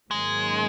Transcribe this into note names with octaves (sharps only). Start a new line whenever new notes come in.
G#2 D#3 F#3 G#3 A#3 C#4